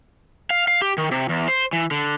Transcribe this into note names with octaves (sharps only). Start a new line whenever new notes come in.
F5
F5
G4
D#3
C3
E2
C5
E3
D3